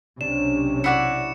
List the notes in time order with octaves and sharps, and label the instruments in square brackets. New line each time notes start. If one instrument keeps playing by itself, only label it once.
[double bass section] B1 C3 C#4 [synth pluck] D4 [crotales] E7
[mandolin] E4 F#4 D5 [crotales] C#7 E7